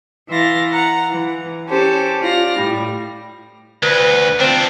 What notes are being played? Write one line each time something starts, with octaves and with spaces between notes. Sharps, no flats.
E3 E5 F5 C6 A6 A#6
F#5 A#5
E3
C#4 G4 A4 C5
F4 D5 F6 A#6
A2 G3
D2 B4
C4 D4 F4